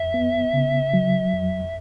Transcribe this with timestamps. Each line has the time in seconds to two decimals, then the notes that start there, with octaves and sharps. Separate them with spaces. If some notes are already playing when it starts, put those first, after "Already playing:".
Already playing: F2 E5
0.14 B3
0.53 C#3
0.94 F#3
1.34 F2